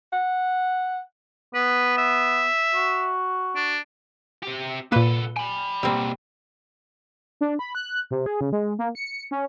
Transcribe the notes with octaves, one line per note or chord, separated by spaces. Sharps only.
F#5
B3 B4
E5
F#4
D4
C4 G4
C2 A#2 A#3 A4 B4
G5 G#5 B5
B2 G3 A#3 C4
D4
B5
F#6
C3
G#4
C#3
G#3
A#3
C#7
C#4